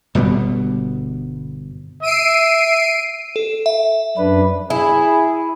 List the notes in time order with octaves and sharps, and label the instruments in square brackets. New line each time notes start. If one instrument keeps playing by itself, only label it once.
[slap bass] G1 B2 G3 B3
[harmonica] E5 [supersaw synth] C7 D7 D#7
[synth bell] A4
E5
[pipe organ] F#2 D4 B4
[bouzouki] E4 [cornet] G#4